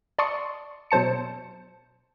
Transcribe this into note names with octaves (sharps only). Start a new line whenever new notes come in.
D5 A5 C6 C#6 D#6 C#7
B2 F#3 C5 A5 C#7